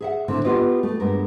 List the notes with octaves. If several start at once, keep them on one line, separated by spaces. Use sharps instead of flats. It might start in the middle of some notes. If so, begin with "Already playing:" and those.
G#4 E5 F#5
A2 D3 C4
B3 F4 G4 B4 D#5
A3
G2 G#3 B3 A#4